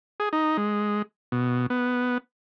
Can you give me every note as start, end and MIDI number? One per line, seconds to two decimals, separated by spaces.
0.20 0.29 68
0.33 0.57 63
0.57 1.02 56
1.32 1.66 47
1.70 2.18 59